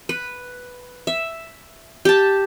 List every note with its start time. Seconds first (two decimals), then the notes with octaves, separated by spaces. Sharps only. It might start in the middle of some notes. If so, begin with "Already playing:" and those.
0.09 B4
1.07 E5
2.05 G4 A5